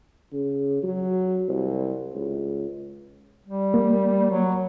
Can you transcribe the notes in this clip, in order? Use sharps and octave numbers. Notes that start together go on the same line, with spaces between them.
C#3
F#3
C2
C#2
G3
A#3
F#3